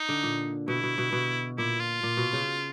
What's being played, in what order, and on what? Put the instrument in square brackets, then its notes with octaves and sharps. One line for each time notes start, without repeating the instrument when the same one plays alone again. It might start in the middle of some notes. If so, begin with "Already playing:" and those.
Already playing: [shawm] D#4
[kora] D3
A#2
[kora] B2 [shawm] E4
[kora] B2
B2
B2
[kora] A#2 [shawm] E4
[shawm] F4
[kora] A#2
B2
C#3